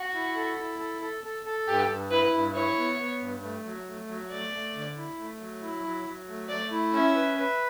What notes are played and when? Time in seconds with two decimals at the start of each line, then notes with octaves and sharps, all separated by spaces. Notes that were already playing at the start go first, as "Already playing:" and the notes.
Already playing: F#4
0.14 E4
0.35 A4
0.58 E4
0.79 A4
1.02 A4
1.24 A4
1.46 A4
1.68 G2 G4
1.89 G2
2.11 E4 B4
2.33 G2
2.55 E4 C#5
2.77 B3
2.99 B3
3.20 G2
3.42 A3
3.65 F#3
3.87 A3
4.08 F#3
4.30 A3 D5
4.53 A3
4.74 D3
4.97 E4
5.18 A3
5.40 F#3
5.62 E4
5.84 F#3
6.06 F#3
6.28 A3
6.49 A3 D5
6.71 E4
6.93 C#4 E5
7.15 B4
7.38 B4